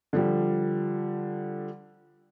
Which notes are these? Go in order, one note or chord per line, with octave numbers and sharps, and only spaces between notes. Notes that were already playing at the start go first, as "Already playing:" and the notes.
D3 F3 G3